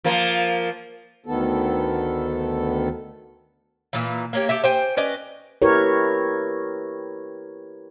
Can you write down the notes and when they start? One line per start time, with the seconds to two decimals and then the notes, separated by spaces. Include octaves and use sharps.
0.04 F3 A#3
1.26 D2 D#3 B3 A4
3.93 A#2 E3
4.33 A#3 C#4 G4
4.49 G4 A4 E5
4.64 C5 G5 G#5
4.97 C#4 B4 D5 D#5
5.62 E4 G4 A#4 B4 C#5